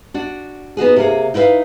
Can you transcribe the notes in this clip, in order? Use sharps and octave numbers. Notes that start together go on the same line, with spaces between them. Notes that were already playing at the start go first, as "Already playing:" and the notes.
D4 F#4
B3 D#4 F#4 G#4
C3 A#3 G#4
D#4 E4 B4 E5 F5